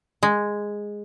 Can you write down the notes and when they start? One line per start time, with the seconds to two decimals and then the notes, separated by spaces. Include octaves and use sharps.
0.23 G#3